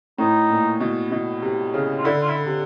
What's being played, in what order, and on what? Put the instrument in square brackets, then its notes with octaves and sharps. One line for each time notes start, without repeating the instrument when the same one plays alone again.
[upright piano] A2 [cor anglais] D#4
[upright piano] A#2
B2
B2
C3
C#3
[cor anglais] F4
[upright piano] D3 [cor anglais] E4
[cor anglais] F4
E4
[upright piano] C3